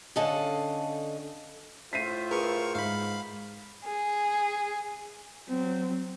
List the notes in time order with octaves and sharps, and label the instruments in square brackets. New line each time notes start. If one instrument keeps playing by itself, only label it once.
[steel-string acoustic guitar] D3 C#4 A4 D#5 F5 F#5
[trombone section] A2 F4 [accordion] C5 E5 [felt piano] B6 C7 D#7
[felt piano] G#4 B4 [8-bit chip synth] A#4 C#6
[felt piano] G#2 [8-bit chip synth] F5 B5
[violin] G#4
[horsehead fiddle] F#3 C4